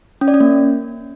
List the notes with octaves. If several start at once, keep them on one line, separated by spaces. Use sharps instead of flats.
C#4
D5
C#4
A#3